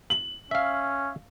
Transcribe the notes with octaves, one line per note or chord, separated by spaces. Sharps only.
F#7
C#4 E5 F5